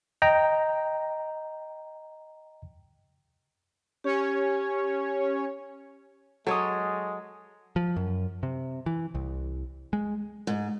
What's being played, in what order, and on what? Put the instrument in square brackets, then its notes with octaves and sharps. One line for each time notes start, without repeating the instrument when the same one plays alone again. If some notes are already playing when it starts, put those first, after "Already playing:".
[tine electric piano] D#5 G5 A#5
[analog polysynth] C#4 C#5 [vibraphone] G4
[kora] F#3 C#5 [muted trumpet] G#3 [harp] A4 D#6
[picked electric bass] F3
F#2
C3
E3
C2
G#3
[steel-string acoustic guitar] G#2